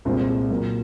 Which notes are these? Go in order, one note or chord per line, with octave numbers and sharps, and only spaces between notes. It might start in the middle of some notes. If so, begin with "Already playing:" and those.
C2 A#2 G#3 C4 F4
A#2 F#3 A#3